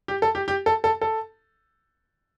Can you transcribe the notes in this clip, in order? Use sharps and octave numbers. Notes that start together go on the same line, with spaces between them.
G4
A4
G4
G4
A4
A4
A4